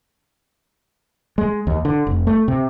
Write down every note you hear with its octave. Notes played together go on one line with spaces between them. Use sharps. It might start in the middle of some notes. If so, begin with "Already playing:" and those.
G#3
D#2
D3
F1
A3
C3